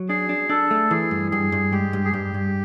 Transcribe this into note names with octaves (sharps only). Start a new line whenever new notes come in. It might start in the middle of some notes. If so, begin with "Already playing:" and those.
Already playing: F#3
D4 G#4
D4
D4 A4
A3
E3 G#4
G2
G2 G#4
G2
G#3 G4
G2
G#4
G2 G4
G2